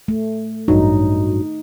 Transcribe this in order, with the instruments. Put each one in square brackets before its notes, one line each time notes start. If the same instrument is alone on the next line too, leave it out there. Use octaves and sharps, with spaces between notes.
[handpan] A3
[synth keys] A1 G2 F#3 [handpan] D#4